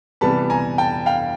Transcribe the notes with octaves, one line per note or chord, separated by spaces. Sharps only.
C3 E3 G3 B3 A5 B5
G#5 A#5
G5 A5
F5 G5